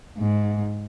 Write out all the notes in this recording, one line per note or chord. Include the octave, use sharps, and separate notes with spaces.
G#2